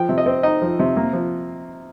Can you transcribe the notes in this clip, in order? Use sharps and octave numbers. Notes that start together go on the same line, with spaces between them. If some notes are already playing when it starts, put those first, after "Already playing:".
Already playing: F3 G5
C3
D#5
C4
D#4 D#5
F3
C3
A#3
F3